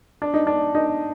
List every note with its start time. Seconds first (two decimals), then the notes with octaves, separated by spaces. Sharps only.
0.22 D4
0.34 D#4
0.47 D4
0.75 D#4